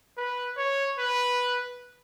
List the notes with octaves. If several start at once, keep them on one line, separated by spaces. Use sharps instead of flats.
B4
C#5
B4